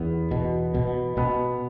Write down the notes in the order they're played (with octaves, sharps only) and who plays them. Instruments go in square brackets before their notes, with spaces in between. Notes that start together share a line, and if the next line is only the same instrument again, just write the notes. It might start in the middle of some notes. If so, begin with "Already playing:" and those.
Already playing: [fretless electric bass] E2 [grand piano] B3
[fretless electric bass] B2
B2
[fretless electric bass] B2 [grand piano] B3